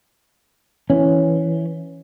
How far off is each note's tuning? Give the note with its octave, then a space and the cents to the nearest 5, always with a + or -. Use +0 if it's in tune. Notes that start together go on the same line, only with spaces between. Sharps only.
E3 +0 C#4 +0